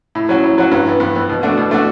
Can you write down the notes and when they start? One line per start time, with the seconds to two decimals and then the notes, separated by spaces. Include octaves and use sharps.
0.15 A2
0.29 F#3 C#4 F#4
0.44 A2
0.58 F#3 C#4 F#4
0.71 G2
0.86 E3 B3
1.00 G2
1.15 E3 B3
1.29 B2
1.43 A3 D4 F#4
1.57 B2
1.71 A3 D4 F#4